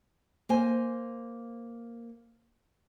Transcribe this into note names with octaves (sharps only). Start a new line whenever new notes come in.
A#3 C5 G#5